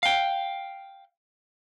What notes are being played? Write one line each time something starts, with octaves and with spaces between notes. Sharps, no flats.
F5 G5